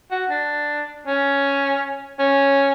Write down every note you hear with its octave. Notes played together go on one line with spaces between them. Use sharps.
F#4
D4
C#4
C#4